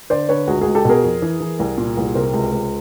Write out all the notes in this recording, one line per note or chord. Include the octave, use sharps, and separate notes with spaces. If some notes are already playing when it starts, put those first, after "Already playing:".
D3 C5 D5
D3 B4 C#5
C#2 F#4 G#4
C#2 F#4 G#4
G4 A4
B2 G#4 A#4
F2
E3
E3
C2
A#2
C2
C3 A#4 C5
C#2
C#2